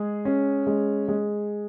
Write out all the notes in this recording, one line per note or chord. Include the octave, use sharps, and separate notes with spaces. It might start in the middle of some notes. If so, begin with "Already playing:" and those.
Already playing: G#3 G#4
C#4
G#3
G#3